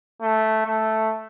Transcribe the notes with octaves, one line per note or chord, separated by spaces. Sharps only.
A3
A3